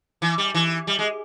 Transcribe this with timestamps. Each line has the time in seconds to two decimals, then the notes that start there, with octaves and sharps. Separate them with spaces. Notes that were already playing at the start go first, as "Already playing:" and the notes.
0.22 E3
0.38 G3
0.54 E3
0.87 G3
0.99 G#3